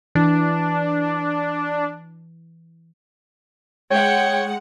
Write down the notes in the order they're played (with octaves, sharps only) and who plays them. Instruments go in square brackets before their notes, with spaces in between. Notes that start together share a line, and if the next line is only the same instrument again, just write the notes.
[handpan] E3 [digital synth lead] D4
[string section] G#3 F#5 [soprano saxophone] C#5 [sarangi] G5